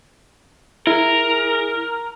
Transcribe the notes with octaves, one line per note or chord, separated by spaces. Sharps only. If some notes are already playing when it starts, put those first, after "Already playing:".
E4 G#4 A#4